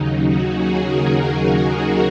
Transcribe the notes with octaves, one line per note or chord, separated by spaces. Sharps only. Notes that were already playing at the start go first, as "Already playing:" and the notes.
Already playing: D#2 C#3 F#3 D#4
F#4
G#4
A#4
G#4
D#4
F#4